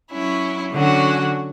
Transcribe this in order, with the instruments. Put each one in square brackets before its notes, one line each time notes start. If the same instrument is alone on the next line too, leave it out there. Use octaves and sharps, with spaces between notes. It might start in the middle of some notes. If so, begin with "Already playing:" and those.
[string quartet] F#3 C#4 E4
D3 F#3 C#4 F#4